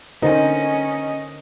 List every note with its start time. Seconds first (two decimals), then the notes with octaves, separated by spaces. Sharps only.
0.22 D3 C#4 D#4 A#4 C5 D#5